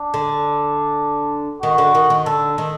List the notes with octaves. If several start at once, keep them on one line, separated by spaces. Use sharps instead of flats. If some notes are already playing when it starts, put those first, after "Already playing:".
Already playing: D4
D3
D#3 F#4
D3
D#3
D#3
D3 A4
D#3